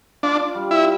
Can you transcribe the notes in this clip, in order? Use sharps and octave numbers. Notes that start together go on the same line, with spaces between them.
D4 F4
G3
E4